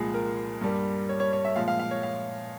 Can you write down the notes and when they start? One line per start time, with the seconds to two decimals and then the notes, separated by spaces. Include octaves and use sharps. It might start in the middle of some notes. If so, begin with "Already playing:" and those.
Already playing: C2 A#2 F3 G#3 G#4
0.14 A#4
0.61 G2 G3 A#3
1.09 C#5
1.20 C#5
1.33 C#5
1.45 E5
1.56 A#2 F3 G#3 F5
1.68 F5
1.79 F5
1.91 C#5
2.03 F5